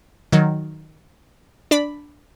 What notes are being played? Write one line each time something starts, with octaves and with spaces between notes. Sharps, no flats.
D#3 F#3
D4 D5 B5